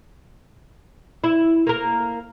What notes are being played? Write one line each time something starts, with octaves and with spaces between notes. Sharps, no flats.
E4
A#3 A#4